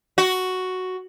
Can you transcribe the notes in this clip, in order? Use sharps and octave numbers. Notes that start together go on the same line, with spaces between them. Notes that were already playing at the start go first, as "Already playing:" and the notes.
F#4